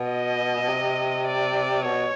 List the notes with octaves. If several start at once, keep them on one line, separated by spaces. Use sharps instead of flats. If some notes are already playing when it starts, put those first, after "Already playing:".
Already playing: B2
D#5
C3
D5
B2 C#5